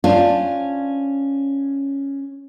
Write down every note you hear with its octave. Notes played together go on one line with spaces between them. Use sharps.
C#4 D4 F4 C5